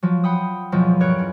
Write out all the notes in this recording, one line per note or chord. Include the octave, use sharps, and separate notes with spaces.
F3 F#3
F#5 G5 B5 D#6
E2 B2 F3 F#3
G2 A#4 C#5 F#6 D7
C#4